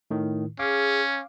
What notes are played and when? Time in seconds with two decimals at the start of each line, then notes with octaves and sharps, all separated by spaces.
0.11 A2 D#3
0.59 C#4 G#4 F5 D6